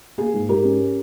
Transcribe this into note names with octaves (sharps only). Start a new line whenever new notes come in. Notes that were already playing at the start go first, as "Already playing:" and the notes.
A#3 G#4
G#2
G#2 G4 A#4
C#4